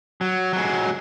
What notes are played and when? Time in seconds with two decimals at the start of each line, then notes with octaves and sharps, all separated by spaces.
0.21 F#3
0.53 F#3 G#3